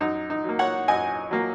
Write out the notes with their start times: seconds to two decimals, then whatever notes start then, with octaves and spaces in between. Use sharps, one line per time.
0.01 F#2 D#4
0.30 D#4
0.44 F#3 A#3
0.59 C#5 F#5
0.88 F#2 D#5 G#5
1.31 F#3 A#3